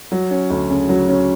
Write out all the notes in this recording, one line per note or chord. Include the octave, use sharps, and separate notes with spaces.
F#3
C#4
D2
C#3
F#3
C#4